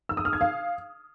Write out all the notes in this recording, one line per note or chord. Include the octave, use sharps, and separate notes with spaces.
E6
D#6
F6
G#6
F5